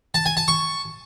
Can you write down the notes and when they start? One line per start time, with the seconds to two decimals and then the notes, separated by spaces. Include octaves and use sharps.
0.14 A5
0.26 G#5
0.37 A5
0.48 C#6